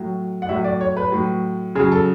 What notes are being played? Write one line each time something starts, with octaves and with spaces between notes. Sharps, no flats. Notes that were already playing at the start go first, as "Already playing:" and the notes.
Already playing: A2 F#3
F#5
A2 F#3 E5
D5
C#5
B4
A2 F#3
C#3 F#3 G#4
A4